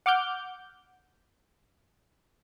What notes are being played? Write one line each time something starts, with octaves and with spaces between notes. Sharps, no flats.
F#5 D6 F6 G6